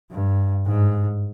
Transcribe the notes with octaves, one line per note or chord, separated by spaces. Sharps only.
G2
G#2